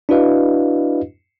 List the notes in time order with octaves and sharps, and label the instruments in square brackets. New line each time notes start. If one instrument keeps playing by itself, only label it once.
[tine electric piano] D4 E4 F#4 B4 D#5 F5